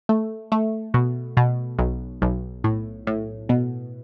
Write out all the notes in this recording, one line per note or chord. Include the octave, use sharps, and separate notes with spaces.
A3
A3
B2
B2
B1
B1
A2
A2
B2